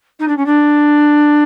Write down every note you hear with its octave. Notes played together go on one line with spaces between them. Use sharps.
D#4
D4
C#4
D4